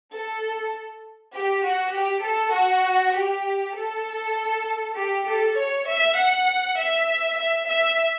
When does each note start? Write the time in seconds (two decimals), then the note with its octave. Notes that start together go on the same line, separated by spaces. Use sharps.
0.13 A4
1.35 G4
1.65 F#4
1.95 G4
2.25 A4
2.55 F#4
3.15 G4
3.77 A4
4.97 G4
5.27 A4
5.57 C#5
5.87 E5
6.18 F#5
6.78 E5
7.38 E5
7.68 E5